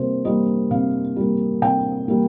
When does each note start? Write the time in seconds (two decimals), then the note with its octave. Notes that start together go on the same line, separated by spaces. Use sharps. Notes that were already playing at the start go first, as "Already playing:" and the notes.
Already playing: C3 G3 A#3 C5
0.25 G3 A#3 D#5
0.71 C3 F5
1.16 G3 A#3
1.62 C3 G5
2.08 G3 A#3